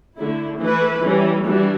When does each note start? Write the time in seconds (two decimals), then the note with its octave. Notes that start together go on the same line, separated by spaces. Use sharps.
0.18 D3 A3 E4
0.60 E3 A3 E4 B4
1.03 E3 G3 C#4
1.46 E3 G3 D4 F#4